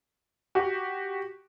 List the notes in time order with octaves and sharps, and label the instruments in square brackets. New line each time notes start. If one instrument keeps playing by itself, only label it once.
[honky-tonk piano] F#4 G4